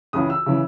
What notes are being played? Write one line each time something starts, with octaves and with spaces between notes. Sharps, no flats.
C#2 C#3 E3 D#6
E6
C#3 E3